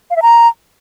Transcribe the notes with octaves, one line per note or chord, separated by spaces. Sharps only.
F5
E5
A#5